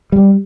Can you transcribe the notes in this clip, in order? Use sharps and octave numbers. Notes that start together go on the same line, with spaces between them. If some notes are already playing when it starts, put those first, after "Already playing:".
G3